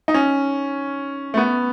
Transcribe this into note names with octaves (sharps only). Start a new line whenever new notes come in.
D#4
C#4
A3
B3